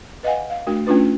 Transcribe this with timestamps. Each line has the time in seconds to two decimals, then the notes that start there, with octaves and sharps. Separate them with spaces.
0.23 B4 D#5 F5 F#5 G#5
0.50 F5
0.67 A3 D4 F#4 A#4
0.87 A3 C#4 D4 F4 B4